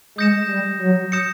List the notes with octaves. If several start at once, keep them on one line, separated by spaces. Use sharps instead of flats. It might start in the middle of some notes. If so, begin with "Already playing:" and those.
G#3 D#6 G6 A#6 C#7 E7
G3
F#3
D#6 G6 A#6 C#7 E7